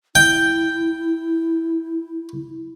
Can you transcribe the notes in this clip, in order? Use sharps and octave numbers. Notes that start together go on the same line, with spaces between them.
E4 G5